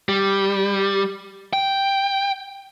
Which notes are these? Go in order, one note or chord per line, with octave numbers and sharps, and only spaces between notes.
G3
G5